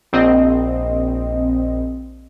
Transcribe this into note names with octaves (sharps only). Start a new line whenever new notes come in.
A#1 C4 D#5